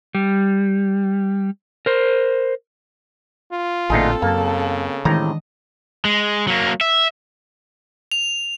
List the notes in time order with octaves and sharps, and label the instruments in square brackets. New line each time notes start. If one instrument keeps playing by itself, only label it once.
[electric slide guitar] G3
A#4 C5
[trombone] F4
[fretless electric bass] A1 A#2 [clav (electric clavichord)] D2 D#4 G#4 [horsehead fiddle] C4 A4
[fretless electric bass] F#2 [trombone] C#3 [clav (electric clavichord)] A#3 A5
[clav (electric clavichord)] A2 C3 A#5 [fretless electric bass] D#3 E3 G#3 [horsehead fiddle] D4 D#5
[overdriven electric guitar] G#3
F#3 A#3
E5
[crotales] F7